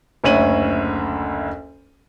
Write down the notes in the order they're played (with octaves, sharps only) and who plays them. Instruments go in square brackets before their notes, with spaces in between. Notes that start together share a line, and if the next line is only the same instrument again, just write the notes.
[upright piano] F#1 D2 C#5 E5 D#7 F#7